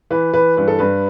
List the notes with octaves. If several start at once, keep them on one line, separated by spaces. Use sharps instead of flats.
E3 B4
E3 B4
G2 B4
A4
G2 B4